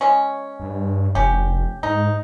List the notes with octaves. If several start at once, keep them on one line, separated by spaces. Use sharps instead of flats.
G#3 C#4
G2
F1 C#4 G4
G#2 D#4